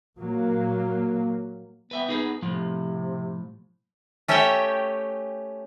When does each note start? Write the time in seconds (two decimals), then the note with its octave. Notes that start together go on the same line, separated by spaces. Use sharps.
0.18 A#2 F#3 A#3
1.91 B3 B4 E5 G5
2.09 D#4 G#4 B4
2.42 A2 C3 F3
4.28 A3 C#4 G4 C#5 E5 G5